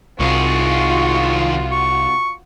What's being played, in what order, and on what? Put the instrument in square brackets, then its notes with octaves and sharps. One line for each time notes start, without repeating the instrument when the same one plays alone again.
[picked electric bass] C2 [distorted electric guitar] D#3 G#4 [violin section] F4 F#4 [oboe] C#6
[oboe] C#6